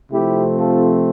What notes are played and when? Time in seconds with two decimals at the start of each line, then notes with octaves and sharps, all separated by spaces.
0.12 C3 F3 A3 C4 E4 G4
0.58 F4 A4